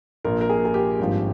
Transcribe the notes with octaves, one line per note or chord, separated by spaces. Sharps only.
A#1 A#2 F3 A#4
A#4
G#4
G#4
G4
G#1 G2 F3